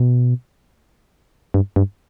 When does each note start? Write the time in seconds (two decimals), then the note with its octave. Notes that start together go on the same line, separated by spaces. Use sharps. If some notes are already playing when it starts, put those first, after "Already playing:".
Already playing: B2
1.54 G2
1.76 G2